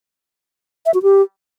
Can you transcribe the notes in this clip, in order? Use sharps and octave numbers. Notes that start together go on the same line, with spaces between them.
E5
F#4
G4